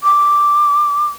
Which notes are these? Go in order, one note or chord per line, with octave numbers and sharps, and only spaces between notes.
D6